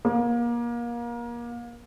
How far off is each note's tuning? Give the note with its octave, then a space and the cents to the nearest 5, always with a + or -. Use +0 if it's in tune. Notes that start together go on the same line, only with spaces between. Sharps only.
A#3 +30